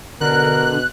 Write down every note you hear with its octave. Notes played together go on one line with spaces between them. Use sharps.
B2 D3 A#4 F#6